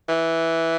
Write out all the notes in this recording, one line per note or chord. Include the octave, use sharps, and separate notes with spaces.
E3